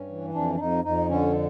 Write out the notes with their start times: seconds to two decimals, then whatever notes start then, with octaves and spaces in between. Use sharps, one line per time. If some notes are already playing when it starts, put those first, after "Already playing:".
Already playing: G2 C#4
0.09 E3
0.34 F2 D4
0.55 D4
0.59 F2 D#4
0.84 F2 D#4
1.09 D3 C#4